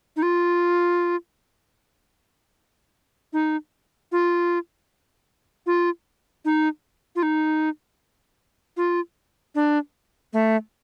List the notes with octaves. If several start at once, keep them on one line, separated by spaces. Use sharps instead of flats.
D#4
F4
D#4
F4
F4
D#4
F4
D#4
F4
D4
A3